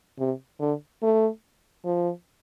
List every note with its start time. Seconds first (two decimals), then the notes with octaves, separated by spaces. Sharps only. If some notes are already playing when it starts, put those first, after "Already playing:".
0.19 C3
0.60 D3
1.03 A3
1.85 F3